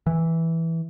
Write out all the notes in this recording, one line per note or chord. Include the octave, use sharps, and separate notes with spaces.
E3